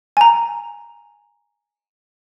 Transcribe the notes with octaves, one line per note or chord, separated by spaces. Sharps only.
G#5 A#5